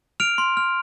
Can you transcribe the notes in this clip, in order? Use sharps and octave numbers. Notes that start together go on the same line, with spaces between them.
F6 D7 F7
C6
F6